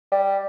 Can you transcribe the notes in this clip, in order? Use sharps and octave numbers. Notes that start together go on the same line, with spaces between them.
G3